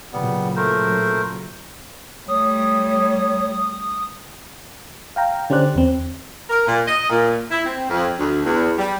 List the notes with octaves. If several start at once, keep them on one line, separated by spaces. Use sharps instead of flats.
A#2 C#3 F#3 G3 B3
A3 A#4 C5
G3 A3 C#5 D#6
F5 G5 A#5
D3 C#4 G4 C5 D5 F#6
E2 C4
A#4
A#2
D#5
A#2
E4
C4
F2
D2
E2
G3